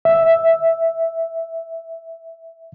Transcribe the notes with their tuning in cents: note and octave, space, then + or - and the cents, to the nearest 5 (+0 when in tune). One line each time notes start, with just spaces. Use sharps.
E5 +0